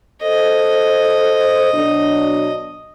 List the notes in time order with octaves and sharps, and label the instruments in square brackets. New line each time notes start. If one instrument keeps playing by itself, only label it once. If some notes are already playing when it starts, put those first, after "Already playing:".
[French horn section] A4 C5 [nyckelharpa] D#5
[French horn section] B2 F#3 D4